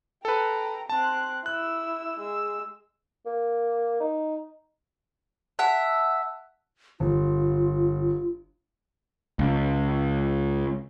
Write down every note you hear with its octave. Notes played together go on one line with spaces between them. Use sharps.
A4 B4 G5 A#5
C4 A5 F#6
E4 E6 F#6
G#3 E6
A#3
D#4
E5 F#5 A5 F#6
G1 F4
C#2